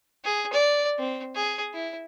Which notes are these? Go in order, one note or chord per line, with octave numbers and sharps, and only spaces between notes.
G#4
D5
C4
G#4
E4